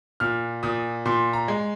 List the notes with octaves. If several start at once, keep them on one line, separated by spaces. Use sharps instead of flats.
A#2 F6
A#2 D#6
A#2 C6
A#5
G#3